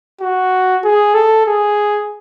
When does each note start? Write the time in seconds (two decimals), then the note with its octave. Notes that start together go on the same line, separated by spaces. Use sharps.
0.21 F#4
0.84 G#4
1.14 A4
1.46 G#4